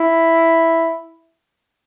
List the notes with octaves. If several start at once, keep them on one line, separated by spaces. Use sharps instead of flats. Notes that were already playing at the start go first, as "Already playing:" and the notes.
Already playing: E4